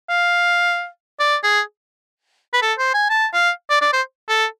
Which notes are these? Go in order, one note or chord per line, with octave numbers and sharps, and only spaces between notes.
F5
D5
G#4
B4
A4
C5
G#5
A5
F5
D5
D5
C5
A4